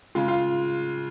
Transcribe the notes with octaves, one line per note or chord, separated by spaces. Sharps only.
C#3 G#3 F4
F4